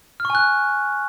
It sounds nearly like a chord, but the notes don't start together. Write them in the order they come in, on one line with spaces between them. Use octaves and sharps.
F6 C#6 G#5 F#6